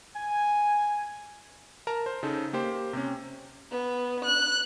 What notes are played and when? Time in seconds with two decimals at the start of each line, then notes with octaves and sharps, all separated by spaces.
0.16 G#5
1.87 A#4 A5 A#5
2.06 C5
2.23 C#3 D#4 A4
2.53 A#3 G4 C5
2.93 C3 C#4
3.71 B3
4.24 F#6